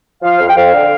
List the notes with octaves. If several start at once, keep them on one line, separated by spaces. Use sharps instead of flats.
F3 F5
F2
G5
F2 F5
D3